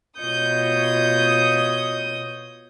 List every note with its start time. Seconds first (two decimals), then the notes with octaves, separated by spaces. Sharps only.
0.19 B2 F4 C#5 D#5 D#6 G6